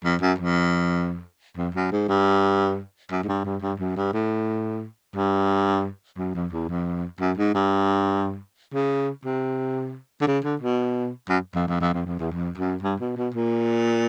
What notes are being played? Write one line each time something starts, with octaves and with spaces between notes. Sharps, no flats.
F2
F#2
F2
F2
F#2
G#2
G2
F#2
G#2
G2
G2
G2
F#2
G2
A2
G2
F#2
F2
E2
F2
F#2
G#2
G2
C#3
C3
D3
C#3
D3
B2
F#2
F2
F2
F2
F2
F2
E2
F2
F#2
G2
B2
B2
A#2